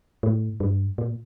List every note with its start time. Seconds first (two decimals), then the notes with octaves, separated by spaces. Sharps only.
0.23 A2
0.60 G2
0.98 A#2